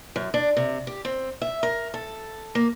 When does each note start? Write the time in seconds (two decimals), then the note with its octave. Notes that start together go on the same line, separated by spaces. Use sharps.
0.16 F#2
0.34 D4
0.57 C3
0.87 G4
1.05 C4
1.42 E5
1.63 A#4
1.94 A4
2.55 A#3